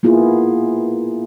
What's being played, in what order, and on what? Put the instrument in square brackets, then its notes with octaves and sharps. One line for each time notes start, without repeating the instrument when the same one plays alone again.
[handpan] A#3 B3 E4 F4 G#4